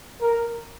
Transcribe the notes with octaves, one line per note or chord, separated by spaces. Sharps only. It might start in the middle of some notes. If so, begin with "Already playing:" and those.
A#4